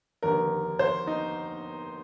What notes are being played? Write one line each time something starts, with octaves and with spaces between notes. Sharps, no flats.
F1 D#2 D3 A#4
C5
D#4